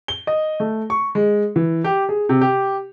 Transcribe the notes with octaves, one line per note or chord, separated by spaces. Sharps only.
G7
D#5
A3
C#6
G#3
E3
G4
G#4
C3
G4